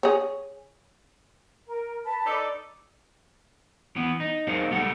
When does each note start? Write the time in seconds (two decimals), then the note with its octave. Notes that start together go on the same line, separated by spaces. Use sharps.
0.03 G#4 C#5
1.67 A#4
2.05 B4 A5 B5
2.26 D#4 A4 D5
3.96 E3 B3
4.20 D#4
4.47 D#4 G#4 A#4 C5 F5
4.71 C#2 G3 A3 A4 F#5